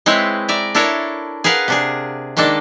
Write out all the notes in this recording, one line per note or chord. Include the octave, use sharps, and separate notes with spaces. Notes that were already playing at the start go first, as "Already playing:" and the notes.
G#3 C4 E4 B4 C#5
D5 E5 A#5
D4 E4 A4 A#4 C#5
G#4 A#4 B4 F5 F#5
C3 D4 G#4
D#3 G#3 A#3 D4 A4